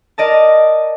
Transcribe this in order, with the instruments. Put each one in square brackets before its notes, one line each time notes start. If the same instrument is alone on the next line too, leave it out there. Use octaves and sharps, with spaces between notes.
[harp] A#4 D5 D#5 A5